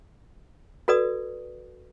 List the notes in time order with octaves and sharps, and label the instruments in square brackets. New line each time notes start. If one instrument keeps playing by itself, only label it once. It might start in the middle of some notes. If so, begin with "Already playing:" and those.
[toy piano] F#4 A4 B4 D5 D#6